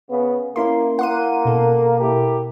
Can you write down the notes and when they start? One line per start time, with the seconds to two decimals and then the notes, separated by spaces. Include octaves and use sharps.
0.10 C#3 B3
0.56 A#3 C#4 E4 C6
0.99 A#3 F#5 C6 D#7
1.45 B2 A4
1.99 E4 G4 A#4